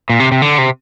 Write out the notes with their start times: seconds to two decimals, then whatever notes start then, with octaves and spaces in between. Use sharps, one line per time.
0.10 A#2
0.20 C3
0.32 C3
0.42 D3
0.58 C3